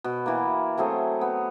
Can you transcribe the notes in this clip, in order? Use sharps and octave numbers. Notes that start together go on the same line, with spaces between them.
B2
E3 A#3
F#3 A3 C4 G#4
B3